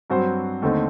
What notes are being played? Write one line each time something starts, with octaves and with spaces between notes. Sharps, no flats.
G2 F#3 C4 F#4 C5
D#2 D3 A3 C4 D#4